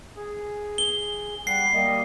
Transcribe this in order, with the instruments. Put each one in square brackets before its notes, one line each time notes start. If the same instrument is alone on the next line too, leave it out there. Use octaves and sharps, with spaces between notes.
[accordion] G#4
[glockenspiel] G7
[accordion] G3 F#5 [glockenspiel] C7
[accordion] G3 A#3 D#5